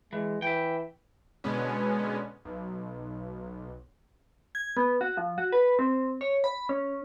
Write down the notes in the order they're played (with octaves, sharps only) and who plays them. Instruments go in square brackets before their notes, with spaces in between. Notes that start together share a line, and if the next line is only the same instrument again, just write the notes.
[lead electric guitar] E3 [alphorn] G#3
[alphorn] E3 [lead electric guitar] E5 G5
[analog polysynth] B2 D3 G#3 B3 C#4
B1
[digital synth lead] G#6
B3
F#4
F3
F#4
B4
C4
C#5
B5
C#4